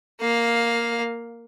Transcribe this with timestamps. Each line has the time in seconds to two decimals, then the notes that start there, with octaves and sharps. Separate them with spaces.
0.21 A#3 F5